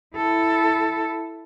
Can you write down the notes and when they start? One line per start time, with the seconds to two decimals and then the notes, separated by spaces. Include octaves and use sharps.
0.16 E4 A4